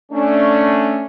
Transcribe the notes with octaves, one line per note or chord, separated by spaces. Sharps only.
A3 C#4 D4